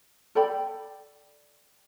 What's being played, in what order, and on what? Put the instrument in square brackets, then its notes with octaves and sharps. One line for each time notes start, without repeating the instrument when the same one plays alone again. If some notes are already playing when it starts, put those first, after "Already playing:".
[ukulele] A4 D5 G5 B5